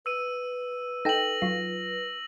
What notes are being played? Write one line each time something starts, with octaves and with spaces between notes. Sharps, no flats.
B4 E6 D#7
D#4 A4 G5 A#6 F#7
F#3 F4